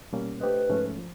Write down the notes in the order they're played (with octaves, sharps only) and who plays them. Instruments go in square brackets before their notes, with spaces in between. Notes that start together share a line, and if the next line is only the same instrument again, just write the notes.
[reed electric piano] B2 G3 A#3 C#4
[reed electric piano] A3 D4 G4 C5 D#5 [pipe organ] B4
[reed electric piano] G#2 F3 A3 C#4
F3